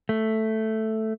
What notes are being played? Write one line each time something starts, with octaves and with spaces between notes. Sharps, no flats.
A3